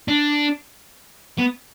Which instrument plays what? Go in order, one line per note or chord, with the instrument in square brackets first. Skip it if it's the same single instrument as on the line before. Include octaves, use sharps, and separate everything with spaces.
[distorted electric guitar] D4
B3